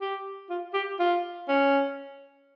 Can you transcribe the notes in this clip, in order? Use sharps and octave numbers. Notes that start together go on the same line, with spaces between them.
G4
F4
G4
F4
C#4